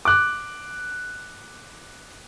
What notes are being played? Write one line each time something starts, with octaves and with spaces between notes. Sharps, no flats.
D6 F#6